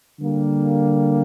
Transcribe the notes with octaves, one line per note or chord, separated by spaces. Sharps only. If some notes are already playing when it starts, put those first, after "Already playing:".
D3 G3 A#3